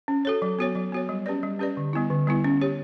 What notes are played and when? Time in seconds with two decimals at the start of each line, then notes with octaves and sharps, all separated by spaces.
0.08 C#4
0.25 F#4 A4 C#5
0.42 F#3
0.59 B3 F#4 C#5
0.75 F#3
0.92 B3 F#4 C#5
1.09 G3
1.26 C#4 G4 B4 D5
1.43 G3
1.59 C#4 G4 B4 D5
1.77 D3
1.93 G3 B3 E4
2.10 D3
2.27 G3 B3 E4
2.44 C#4
2.61 G4 C#5